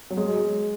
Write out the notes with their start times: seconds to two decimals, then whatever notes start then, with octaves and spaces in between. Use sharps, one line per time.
0.10 F#3
0.17 G#3